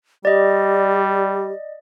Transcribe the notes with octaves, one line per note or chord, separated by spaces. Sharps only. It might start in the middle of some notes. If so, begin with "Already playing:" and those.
G3 G4 D5 D#5